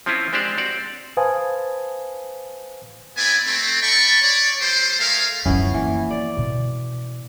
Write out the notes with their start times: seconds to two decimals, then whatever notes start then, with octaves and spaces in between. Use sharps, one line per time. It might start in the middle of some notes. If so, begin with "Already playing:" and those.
0.06 F3 C4 C#4 E4 F4
0.33 G#3 C4 D4 G4 C5 D5
0.58 C4 F#4 D5
1.17 B4 C5 F5 G#5 A5 D#6
3.17 B3 C4 E4 D5 G#5
3.46 A3 C4
3.81 D5 G5 A5 B5 C#6
4.22 C#5 D5
4.61 G3 A3 C5
4.99 A3 G#4 A#4 F5
5.46 F#2 F3 B3 C#4 E4
5.74 E3 A#3
6.11 D5
6.37 B2